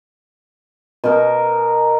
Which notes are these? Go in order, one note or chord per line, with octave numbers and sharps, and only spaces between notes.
B2 A#4